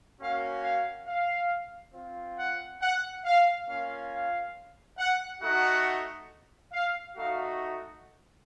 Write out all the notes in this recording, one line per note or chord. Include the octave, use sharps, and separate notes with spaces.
A#3 C#4 F#4 F5
F5
F5
C4 F4
F#5
F#5
F5
A#3 C#4 F4 F5
F5
F#5
A3 D#4 F#4 F#5
F5
A3 D#4 F#4 F5